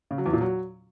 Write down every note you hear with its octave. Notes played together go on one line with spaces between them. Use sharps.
C#3
F#3
E2
A#2
F#3